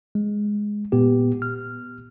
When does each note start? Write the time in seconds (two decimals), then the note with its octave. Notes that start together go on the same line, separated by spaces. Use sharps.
0.15 G#3
0.92 A#2 B3 G4
1.42 F6